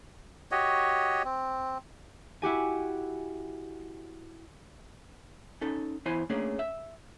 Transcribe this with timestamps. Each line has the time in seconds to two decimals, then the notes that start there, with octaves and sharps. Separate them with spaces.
0.51 F#4 G4 C#5 D#5
1.24 C4
2.42 E4 F#4 G4 G#5
5.61 C#4 D#4 A4
6.06 E2 E4 C5 G#5 B5
6.30 A3 A#3 C#4 D4 G#4
6.59 E5